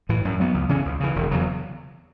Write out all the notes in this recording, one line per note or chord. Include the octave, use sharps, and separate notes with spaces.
A2 E3
F#2
F#3 B3
C#2
C#3 E3 C#4
C#2
C#3 E3
E1
E2 C#3 F#3